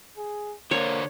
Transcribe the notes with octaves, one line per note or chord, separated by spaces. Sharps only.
G#4
D3 A#3 D4 C5 C#5